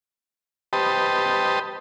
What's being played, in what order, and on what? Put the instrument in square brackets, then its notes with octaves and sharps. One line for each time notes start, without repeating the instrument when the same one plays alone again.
[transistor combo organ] G4 B4 C5 D#5 A5